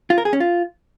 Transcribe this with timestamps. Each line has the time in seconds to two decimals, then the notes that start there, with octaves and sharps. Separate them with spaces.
0.10 F4
0.18 A#4
0.25 G#4
0.33 C#4
0.40 F4